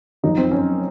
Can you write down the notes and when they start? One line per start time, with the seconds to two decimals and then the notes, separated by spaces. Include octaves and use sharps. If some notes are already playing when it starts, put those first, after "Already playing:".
0.23 F#1 F#2 F3 D#4
0.37 C4
0.51 C#4